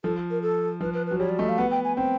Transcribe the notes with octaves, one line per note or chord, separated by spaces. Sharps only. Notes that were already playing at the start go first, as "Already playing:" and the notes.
F3 A4
A#4
A4
F3 B4
B4
B4
F#3
G3 C#5
D5
A3 D#5
F5
B3 F#5
G5
G#5
C4 G5